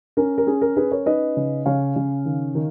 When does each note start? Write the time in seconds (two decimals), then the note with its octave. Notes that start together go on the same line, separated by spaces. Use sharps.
0.17 C#4 A#4
0.38 A#4
0.47 C#4 G#4
0.62 A#4
0.76 C#4 G#4 B4
0.91 A#4 C#5
1.06 D#4 B4 D#5
1.37 C#3
1.66 C#3 C#5 F5
1.96 C#3
2.25 D#3
2.55 D#3